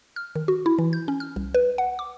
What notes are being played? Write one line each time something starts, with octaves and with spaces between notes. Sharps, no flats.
F6
D#3
F#4
E4
E3
G6
C#4
F6
C2
B4
F#5
D6